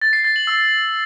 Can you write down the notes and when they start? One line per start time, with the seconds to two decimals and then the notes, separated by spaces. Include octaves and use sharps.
0.02 A6
0.13 C7
0.24 A6
0.36 F#7
0.47 E6